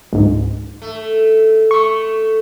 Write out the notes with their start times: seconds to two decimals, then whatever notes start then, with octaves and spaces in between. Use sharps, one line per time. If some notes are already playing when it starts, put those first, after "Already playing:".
0.13 C#2 G#2
0.82 A3
1.71 A3 C#6